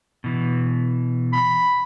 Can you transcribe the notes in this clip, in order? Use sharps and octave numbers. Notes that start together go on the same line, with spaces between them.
B2 E3
B5